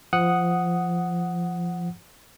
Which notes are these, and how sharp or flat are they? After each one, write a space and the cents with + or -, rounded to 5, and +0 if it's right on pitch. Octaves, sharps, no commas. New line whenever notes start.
F3 -15 F#5 +0 D#6 +0